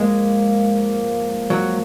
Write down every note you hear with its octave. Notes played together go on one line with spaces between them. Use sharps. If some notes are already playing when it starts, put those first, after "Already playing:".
Already playing: G#2 F3 G#3 A#3
F#3